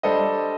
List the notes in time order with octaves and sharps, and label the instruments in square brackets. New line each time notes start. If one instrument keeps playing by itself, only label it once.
[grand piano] G3 D4 A4 C5 D#5